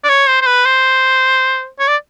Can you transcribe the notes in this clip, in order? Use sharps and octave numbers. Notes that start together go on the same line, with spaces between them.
D5
C#5
C5
C5
B4
C5
C#5
D5